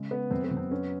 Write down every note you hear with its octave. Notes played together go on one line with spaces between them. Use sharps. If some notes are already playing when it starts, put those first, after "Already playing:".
Already playing: C#3 G#3
B3
F#2 C4
B3
F#2
C4
B3 C#4